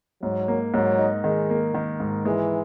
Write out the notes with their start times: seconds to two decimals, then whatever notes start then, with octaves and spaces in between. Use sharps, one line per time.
0.23 G#2 F#3
0.48 A#3
0.74 G#2 F#3
0.99 D#4
1.24 D#3 G#3
1.50 A#3
1.74 D#3
2.00 G#2
2.25 E3 G#3